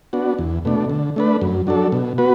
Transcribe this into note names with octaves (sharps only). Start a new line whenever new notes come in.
B3 D4 F#4
E2
B2 A3 D4
D3
A3 D4 B4
F#2
F#3 D4 A4
B2
B3 F#4 B4